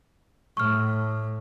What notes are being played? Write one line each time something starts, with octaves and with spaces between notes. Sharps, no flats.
A2 C#6 F6